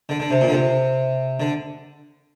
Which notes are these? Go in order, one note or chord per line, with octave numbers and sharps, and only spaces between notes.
D3
D3
C3
A#2
D3
C3
D3